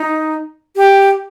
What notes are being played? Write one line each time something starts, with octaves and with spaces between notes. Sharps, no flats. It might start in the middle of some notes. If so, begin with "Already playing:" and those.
Already playing: D#4
G4